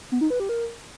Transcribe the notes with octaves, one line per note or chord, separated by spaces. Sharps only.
B3
D#4
B4
G4
A#4